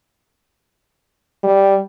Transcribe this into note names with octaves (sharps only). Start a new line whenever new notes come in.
G3